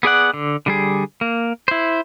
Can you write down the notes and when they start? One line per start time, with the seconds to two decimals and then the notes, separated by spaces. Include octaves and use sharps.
0.03 B3 G#4 D5 F#5
0.34 D3
0.66 D3 G3 G#4
1.21 A#3
1.68 E4 C5